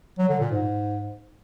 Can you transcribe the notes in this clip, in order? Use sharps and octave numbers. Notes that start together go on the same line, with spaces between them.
F#3
D3
A#2
G#2